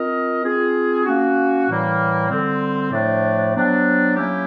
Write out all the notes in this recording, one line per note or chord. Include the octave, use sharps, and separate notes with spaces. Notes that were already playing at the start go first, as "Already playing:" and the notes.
Already playing: C4 F4 A#4 D#5
C4 F4 G#4
A#3 C#4 F#4
A2 E3 G3 A#3
D3 G3 C4
A2 F3 A3 D4
F#3 B3 D4 G4 C5
F#3 A#3 C#4 E4 G4